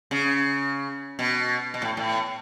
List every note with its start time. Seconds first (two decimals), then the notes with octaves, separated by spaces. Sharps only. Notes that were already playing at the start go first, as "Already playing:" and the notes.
0.11 C#3
1.19 B2
1.74 B2
1.82 A2
1.97 A2